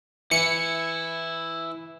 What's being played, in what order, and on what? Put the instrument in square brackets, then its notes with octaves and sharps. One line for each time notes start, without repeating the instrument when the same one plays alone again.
[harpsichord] E3 [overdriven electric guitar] E4 [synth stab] C#7